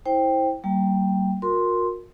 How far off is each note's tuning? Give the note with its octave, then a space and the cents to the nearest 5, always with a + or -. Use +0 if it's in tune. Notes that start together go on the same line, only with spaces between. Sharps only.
E4 -25 C5 +10 G5 +5
G3 -35 A#3 -15 G5 +0
F#4 -40 A#4 +0 C6 +0